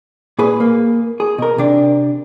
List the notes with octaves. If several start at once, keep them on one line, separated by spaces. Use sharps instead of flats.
A#2 G#4 B4
A#3
G#4
B2 A#4
C3 D4